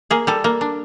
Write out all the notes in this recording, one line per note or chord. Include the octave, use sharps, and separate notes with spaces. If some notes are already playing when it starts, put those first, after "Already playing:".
A#3 G#4
G3 A4
A#3
D4